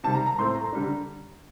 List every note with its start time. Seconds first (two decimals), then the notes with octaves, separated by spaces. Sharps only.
0.04 C3 D#3 G3 A5
0.15 A#5
0.26 A#5
0.38 A2 A3 C4 C6
0.54 A#5
0.73 D3 G3 D4